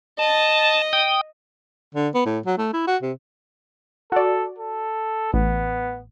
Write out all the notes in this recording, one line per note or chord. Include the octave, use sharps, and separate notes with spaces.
D#5 A5
G5 D#6
D3
B3
A2
F#3
A3
E4
F#4
C3
F#4 A4 D5
A4
A1 B3